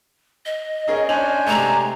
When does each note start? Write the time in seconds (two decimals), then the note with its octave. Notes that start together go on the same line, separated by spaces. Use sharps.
0.46 D#5
0.88 C#4 D#4 G#4 A#4
1.09 C#4 D4 C5 G#5 F7 F#7
1.46 C3 G#3 A3 A#5